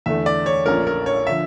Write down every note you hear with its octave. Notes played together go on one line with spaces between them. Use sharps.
E2 D3 A3 E5
D5
C#5
A#1 A#2 A3 C#4 A#4
A#4
C#5
D3 F3 E5